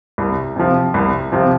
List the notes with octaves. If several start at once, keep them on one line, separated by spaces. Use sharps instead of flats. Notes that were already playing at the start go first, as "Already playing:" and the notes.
C2
C3 F3
C2
C3 F3